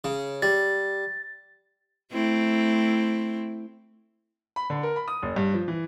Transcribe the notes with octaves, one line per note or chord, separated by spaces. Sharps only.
C#3
G3 A6
A3 C4 E4
B5
D3
A#4
B5
D#6
F#1
G2
F3
E3